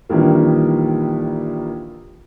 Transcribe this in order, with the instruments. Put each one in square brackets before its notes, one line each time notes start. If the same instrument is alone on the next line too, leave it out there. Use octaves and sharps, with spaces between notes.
[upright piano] A#1 D#3 E3 G3 A#3